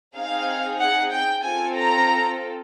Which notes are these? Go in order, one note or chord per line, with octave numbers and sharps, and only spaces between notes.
C4 D#4 G#4 F5
F#5
G5
C4 F4 A4 G#5
A#5